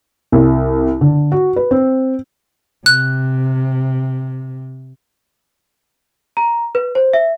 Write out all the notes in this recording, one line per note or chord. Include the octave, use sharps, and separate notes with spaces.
C2
D3
F#4
B4
C4
C3 F#6
A#5
B4
C5
E5